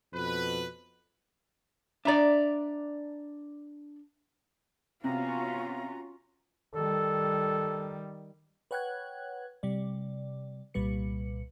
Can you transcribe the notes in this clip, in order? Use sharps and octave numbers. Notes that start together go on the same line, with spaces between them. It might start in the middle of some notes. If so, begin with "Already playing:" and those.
F2 B2 B4
D4 D5 E5 A#5
C3 B3 C#4 F4 F#4 F5 A#5
D#3 G3 A4
B4 C#5 F#5 G5 F#6 G#6
C3 G3 D5
C2 A#2 G3 B4 C#7